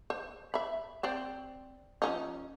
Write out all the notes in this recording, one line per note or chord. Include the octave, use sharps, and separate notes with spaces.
C5
E5 B5
C4 C5 D5
F3 C#4 D#4